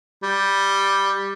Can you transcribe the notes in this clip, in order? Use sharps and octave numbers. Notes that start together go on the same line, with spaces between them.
G3